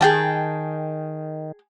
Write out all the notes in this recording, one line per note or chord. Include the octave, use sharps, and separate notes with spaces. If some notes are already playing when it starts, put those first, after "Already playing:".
D#3 G#4 G5 A5